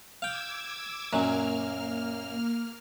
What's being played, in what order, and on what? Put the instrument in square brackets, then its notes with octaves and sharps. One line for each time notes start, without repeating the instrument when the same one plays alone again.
[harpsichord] F5 G5 [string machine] D6 E6 G#6
[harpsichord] F#2 A#2 F#3 [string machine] A#3 F6